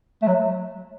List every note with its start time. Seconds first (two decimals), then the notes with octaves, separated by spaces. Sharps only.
0.22 A3
0.27 F#3